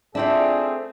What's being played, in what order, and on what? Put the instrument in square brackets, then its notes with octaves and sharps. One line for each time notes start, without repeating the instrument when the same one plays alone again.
[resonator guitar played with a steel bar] A3 E4 E5 [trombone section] C4 G#4 [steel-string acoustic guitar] D4 F4